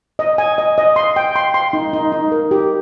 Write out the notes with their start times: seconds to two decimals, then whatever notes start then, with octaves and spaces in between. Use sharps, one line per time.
0.19 D#5
0.38 G#5
0.58 D#5
0.78 D#5
0.96 C6
1.16 G5
1.36 C6
1.54 C6
1.73 D#4
1.93 D#4
2.12 D#4
2.32 A#4
2.51 G4